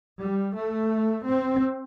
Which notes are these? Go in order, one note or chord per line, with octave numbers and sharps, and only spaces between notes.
G3
A3
C4